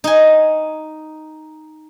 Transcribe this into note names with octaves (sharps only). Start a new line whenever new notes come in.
D#4 G#5